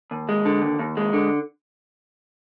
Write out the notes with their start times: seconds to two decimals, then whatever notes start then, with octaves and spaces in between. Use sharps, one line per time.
0.11 D#2
0.29 G#3
0.45 D3
0.62 D#2
0.79 D#2
0.97 G#3
1.13 D3